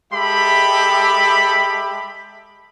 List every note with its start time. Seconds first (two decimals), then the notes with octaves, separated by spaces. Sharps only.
0.13 G#3 G4 A4 E5 B5